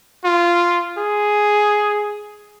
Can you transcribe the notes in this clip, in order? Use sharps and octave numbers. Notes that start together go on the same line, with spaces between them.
F4
G#4